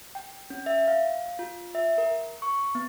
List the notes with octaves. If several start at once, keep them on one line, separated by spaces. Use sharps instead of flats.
G5
C#4
E5
F5
F4
E5
A#4
C#6
B3